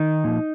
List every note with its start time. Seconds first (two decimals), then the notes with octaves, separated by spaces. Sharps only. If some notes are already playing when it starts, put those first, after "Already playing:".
Already playing: D#3 D#4
0.24 A#2 F3